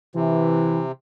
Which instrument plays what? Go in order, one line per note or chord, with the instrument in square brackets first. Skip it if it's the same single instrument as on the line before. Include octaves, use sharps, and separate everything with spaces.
[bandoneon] C3 [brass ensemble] E3